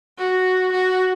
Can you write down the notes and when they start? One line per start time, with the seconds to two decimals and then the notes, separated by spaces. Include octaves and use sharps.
0.18 F#4
0.71 F#4